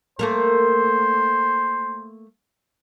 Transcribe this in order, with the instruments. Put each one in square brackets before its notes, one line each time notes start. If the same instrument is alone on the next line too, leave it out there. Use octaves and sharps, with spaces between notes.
[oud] A3 A#3 A#4 [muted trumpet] C5